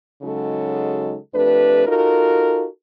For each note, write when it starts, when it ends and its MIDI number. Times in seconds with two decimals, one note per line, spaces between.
0.22 1.16 49
0.22 1.16 54
0.22 1.16 56
0.22 1.16 63
0.22 1.16 66
0.22 1.16 69
1.34 1.86 41
1.34 1.86 57
1.34 1.86 62
1.34 1.86 67
1.34 1.86 71
1.87 2.66 63
1.87 2.66 65
1.87 2.66 66
1.87 2.66 69
1.87 2.66 70